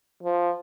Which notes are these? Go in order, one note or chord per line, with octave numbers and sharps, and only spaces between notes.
F3